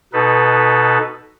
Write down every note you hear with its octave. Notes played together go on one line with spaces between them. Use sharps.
B2 D#4 A4 B4